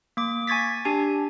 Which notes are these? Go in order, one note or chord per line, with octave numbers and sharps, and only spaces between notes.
A#3 D6
G#5 C#6 G#6 A6 B6
D4 G4 G#5